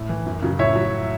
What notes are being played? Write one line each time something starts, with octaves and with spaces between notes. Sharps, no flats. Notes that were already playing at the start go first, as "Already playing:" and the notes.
Already playing: A2
E3
F#2
C#3 F#3
A2 C#5 E5
F#3